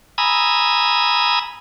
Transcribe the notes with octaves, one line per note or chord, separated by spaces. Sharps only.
G#5 A#5 B5 D#6 E6